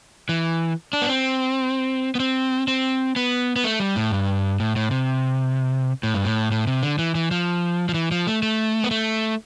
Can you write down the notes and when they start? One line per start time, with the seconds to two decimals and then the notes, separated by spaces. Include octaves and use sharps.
0.29 E3
0.93 D4
1.02 B3
1.09 C4
2.15 B3
2.20 C4
2.68 C4
3.16 B3
3.56 B3
3.64 A3
3.80 G3
3.96 A2
4.12 G2
4.60 A2
4.76 A2
4.91 C3
6.03 A2
6.14 G2
6.25 A2
6.51 A2
6.67 C3
6.83 D3
6.99 E3
7.15 E3
7.31 F3
7.89 F3
7.94 E3
8.11 F3
8.27 A3
8.43 A3
8.84 B3
8.91 A3